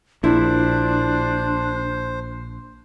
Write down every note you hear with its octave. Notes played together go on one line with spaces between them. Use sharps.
A#1 D4 E4 C5